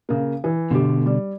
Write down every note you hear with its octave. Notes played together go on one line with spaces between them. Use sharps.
C#3 A#3
E3
G1 B2 D3 G4
G3